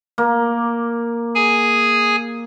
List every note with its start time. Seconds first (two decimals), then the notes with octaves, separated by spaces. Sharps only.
0.18 A#3
1.35 G#4 G#5